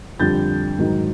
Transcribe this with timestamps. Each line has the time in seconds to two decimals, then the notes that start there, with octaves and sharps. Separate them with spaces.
0.19 F2 D3 G3 G6 A6
0.78 G#2 D#3 F#3